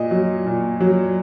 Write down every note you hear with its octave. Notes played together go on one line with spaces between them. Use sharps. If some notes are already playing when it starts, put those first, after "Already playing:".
Already playing: A#2 D#5
F#3
A#2
F#3